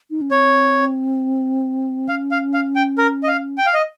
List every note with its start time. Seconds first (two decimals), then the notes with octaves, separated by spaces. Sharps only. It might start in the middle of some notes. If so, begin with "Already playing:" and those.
0.10 D#4
0.21 C#4
0.31 C4 C#5
2.09 C#4 F5
2.31 F5
2.54 F5
2.76 G5
2.98 A#4
3.23 D#5
3.28 F5
3.58 G5
3.66 F5
3.74 D#5